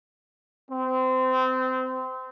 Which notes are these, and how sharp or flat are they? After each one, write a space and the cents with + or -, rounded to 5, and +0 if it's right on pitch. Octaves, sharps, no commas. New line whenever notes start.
C4 -25